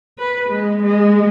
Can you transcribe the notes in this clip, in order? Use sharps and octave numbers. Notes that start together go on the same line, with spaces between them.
B4
G#3
G#3